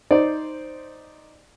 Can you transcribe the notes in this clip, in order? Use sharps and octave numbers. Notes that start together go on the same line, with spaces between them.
D#4 C5 D5